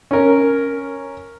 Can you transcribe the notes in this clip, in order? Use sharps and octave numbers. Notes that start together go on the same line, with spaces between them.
C#4 A#4